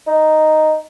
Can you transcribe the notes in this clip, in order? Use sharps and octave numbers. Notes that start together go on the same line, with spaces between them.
D#4